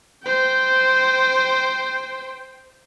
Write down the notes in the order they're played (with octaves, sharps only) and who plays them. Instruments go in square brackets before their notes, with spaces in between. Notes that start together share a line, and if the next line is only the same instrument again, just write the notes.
[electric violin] C5 G5